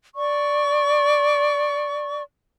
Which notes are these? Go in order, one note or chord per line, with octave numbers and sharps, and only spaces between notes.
D5 C#6